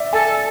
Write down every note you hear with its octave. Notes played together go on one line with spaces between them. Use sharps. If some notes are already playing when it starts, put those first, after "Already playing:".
Already playing: D5 E5
A4 G#5